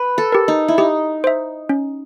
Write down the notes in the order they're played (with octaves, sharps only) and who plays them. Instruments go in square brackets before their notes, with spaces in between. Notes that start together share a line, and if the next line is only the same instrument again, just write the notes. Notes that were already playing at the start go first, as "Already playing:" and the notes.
Already playing: [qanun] B4
A4
[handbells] G4 A#4
[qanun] D#4
E4
[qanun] D#4 [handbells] G4
[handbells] C5 E5
C#4